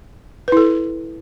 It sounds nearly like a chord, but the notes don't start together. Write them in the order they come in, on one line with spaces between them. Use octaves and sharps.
B4 E4 A4